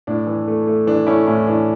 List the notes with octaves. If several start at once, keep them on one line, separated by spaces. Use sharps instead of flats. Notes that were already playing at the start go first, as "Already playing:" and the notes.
A2 D4
E3
A3
A3
E3 D4
A3 C#4 E4
A2 C#4 E4
E3 D4